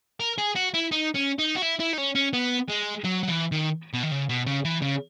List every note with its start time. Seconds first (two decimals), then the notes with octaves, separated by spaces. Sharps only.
0.20 A#4
0.38 G#4
0.56 F#4
0.74 E4
0.91 D#4
1.14 C#4
1.39 D#4
1.56 F#4
1.62 E4
1.80 E4
1.93 D#4
1.98 C#4
2.15 C#4
2.33 B3
2.69 G#3
3.05 F#3
3.23 F#3
3.28 E3
3.52 D#3
3.93 B2
4.03 D#3
4.11 C#3
4.29 B2
4.46 C#3
4.65 E3
4.82 C#3